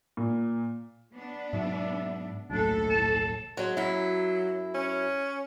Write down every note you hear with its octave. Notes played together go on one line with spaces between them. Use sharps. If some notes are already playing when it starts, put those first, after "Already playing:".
A#2
B3 D4
G#2 B2 F#3 E5
D#1 B1 A2 D4 A4
A5
F#3 G#3
F#2 F#3 E4
C#4